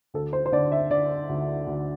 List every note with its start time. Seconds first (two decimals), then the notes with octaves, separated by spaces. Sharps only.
0.14 D2 A4
0.33 C5
0.46 C5
0.52 D3 D5
0.72 E5
0.90 D3 D5
1.29 D2
1.67 D2